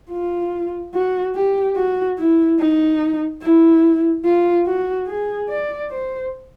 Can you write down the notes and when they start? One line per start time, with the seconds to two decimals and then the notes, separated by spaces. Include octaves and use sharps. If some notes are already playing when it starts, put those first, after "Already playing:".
0.11 F4
0.94 F#4
1.35 G4
1.77 F#4
2.18 E4
2.60 D#4
3.43 E4
4.25 F4
4.66 F#4
5.07 G#4
5.49 D5
5.91 C5